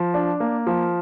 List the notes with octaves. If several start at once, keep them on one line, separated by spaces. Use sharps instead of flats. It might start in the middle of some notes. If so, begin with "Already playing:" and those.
Already playing: F3
D4
A#3
F3